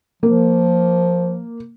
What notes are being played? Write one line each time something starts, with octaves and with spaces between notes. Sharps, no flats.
F3 A#3